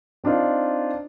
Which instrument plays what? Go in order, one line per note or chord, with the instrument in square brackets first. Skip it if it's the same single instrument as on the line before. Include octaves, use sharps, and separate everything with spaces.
[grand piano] C4 D4 D#4 F4